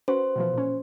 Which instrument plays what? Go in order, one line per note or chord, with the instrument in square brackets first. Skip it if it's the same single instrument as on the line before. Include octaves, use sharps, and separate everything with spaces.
[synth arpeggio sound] C#4 F#4 B4 [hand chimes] C5
[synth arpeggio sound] B2 E3 F3
A#2 C#4